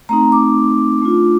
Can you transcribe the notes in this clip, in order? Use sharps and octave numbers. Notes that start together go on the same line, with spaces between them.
A3 C4 D#4 A#5
D6
A3 D4 F4